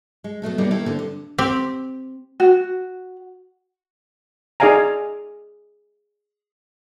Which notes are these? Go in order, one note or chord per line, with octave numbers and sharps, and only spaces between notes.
G#3
B2 F#3 A3 A4
G3 A#3 B3 C#4 D#4 D5
B2 D#3 A#3 E4 G4 A4
D3 C4
G2
C4 G4
F#4
D#4 G#4 D5 F5 G#5 A#5